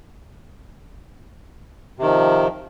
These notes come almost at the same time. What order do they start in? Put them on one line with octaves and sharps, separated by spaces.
C3 D#3 F3